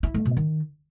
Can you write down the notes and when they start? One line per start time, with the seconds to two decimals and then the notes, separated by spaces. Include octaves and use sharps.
0.03 E4
0.14 A3
0.26 B2
0.37 D#3